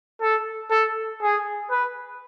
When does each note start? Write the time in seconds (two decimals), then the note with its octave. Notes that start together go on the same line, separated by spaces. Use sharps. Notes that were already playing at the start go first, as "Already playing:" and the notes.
0.21 A4
0.71 A4
1.22 G#4
1.71 B4